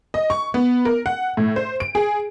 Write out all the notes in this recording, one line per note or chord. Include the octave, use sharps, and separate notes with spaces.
D#5
C#6
B3
A#4
F#5
A2
C5
D7
G#4